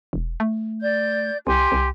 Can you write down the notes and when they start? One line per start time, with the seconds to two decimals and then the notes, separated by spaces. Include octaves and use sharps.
0.13 E1
0.40 A3
0.83 D5 G6
1.47 C2 G4 G#5 C6
1.72 C2